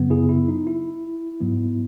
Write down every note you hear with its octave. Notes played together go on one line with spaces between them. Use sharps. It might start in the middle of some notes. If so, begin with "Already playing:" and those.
Already playing: F#2 C#3 F#3 B3
E4 G#4
E4
D#4
E4
G#2 F#3 B3